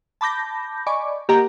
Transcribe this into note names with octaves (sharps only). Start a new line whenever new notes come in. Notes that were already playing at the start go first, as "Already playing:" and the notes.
A5 B5 D6 G6 A#6
D5 D#5 G#5 B5 C#6 D6
A#3 G4 A#4 D#5 F#5 A#5